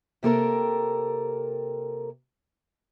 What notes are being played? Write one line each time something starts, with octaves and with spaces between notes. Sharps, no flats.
C3 A#3 A4 A#4